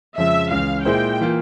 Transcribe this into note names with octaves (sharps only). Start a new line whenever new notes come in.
F2 C#3 F3 G#3 E5
C#2 C#3 E3 F5
A#2 G#3 E4 G#4 C5 G5
E3 A#3 F4